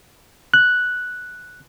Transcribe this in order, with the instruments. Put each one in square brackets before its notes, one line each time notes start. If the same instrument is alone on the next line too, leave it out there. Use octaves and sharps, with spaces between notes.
[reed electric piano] F#6